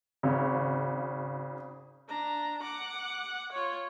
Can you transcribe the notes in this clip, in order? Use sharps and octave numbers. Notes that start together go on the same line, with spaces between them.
G#1 C#3
D4 A#5
F#5 D6
F4 C#5